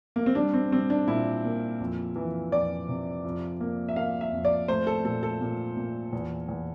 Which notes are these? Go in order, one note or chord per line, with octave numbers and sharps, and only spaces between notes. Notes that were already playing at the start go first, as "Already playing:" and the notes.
A#3
C4
G3 D4
C4
G3 C4
D4
A#2 E4
A#3
F2
E3
F2 D5
C3
F2
A#3
E5
A#3 F5
E5
F2
D5
A3 C5
A4
A#2 A4
A4
A#2
A#2
E2
E2